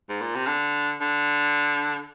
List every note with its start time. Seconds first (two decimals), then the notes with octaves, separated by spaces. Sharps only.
0.09 G#2
0.21 A#2
0.35 C3
0.47 D3
1.01 D3